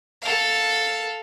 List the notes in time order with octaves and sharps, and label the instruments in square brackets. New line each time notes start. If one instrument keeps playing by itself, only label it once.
[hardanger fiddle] A4 F5